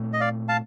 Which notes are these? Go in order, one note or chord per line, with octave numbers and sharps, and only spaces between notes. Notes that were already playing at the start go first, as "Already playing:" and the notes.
Already playing: A#2 A3 C4
D#5
D5 F5
F5 A5